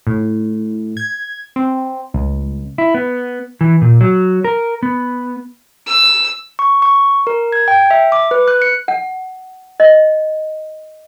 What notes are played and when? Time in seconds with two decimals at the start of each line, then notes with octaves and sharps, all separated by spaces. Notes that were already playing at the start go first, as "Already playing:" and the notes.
0.07 A2
0.97 G#6
1.56 C4
2.14 C#2
2.78 E4
2.94 B3
3.61 E3
3.82 A#2
4.01 F#3
4.44 A#4
4.83 B3
5.87 E6
6.59 C#6
6.82 C#6
7.27 A#4
7.52 G#6
7.68 G5
7.91 E5
8.12 D6
8.31 B4
8.48 F#6
8.62 C#7
8.88 F#5
9.80 D#5